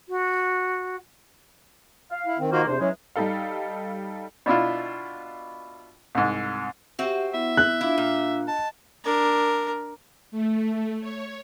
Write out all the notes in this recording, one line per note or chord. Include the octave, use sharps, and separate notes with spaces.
F#4
F5
E4
D#3 C4
D#3 A#3 F4 F#4 C5
E2 C3 D4 C5
E3 F#3 G#3 C#4
G3 D#4 A4 F5
B2 D4 E4 F4
C2 G#2
C4 F#4 G4 E5
B3 E4 E5
F#6
D4 E4 F4 F5
A#2
D#5 A5
D4 A#4
A3
C#5